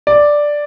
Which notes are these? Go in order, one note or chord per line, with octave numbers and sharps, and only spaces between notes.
D5